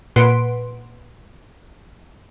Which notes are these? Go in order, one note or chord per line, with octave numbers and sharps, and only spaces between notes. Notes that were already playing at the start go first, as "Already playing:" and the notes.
A#2 B4 F#5 C6 B6 D7